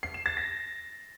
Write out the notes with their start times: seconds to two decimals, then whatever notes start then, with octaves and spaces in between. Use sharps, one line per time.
0.03 C7
0.14 E7
0.26 A6
0.37 A#6